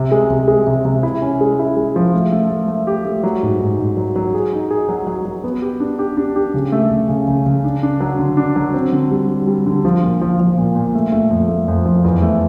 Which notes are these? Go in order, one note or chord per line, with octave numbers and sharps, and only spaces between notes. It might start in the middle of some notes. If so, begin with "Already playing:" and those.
Already playing: C3
G#3
C3
G#3
C3
C3
E4
C#4
G#3
E4
G#3
F3
A3
A3
A3
A3
G4
A3
F#3
G#2
G#2
G#2
F#3
F#3
G#4
D#4
G#4
F#3
F#3
F#3
B3
G4
D4
G4
D4
G4
C#3
A3
C#3
C#3
C#3
C#3
D4
D4
F#3
D3
D4
F#3
C4
D3
G3
G3
G3
D3
F3
A#2
F3
F3
A#2
A#2
A3
A3
F2
A3
F2
F3
E2
A3